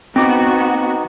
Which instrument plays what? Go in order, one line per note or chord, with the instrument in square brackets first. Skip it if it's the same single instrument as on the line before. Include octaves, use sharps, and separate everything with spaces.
[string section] B3 F#4 [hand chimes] C4 [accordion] D#4 [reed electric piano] G5 D6